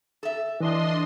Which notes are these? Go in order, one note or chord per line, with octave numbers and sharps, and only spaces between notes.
A4 E5
E3 D4 D#5 C6